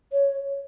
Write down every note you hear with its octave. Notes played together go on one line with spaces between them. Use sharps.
C#5